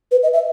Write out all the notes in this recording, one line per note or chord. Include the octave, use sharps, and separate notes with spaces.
B4
D#5
E5